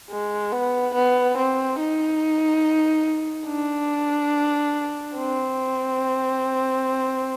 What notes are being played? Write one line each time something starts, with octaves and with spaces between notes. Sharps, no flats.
G#3
B3
B3
C4
D#4
D4
C4